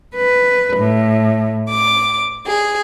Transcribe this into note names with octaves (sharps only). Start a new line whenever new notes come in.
B4
A2
D6
G#4